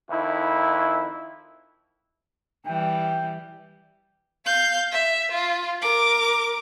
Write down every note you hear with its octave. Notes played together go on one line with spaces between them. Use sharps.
F2 D#3 E4
E3 G3 G5
F5 G6
E5
F4
A#4 D6